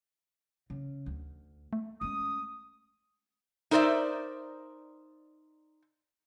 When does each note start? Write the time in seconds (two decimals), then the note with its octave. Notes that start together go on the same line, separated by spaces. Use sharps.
0.70 C#3
1.06 D2
1.73 A3
2.01 G#3 C#4 D#6
3.71 D#4 A#4 C5 D5 E5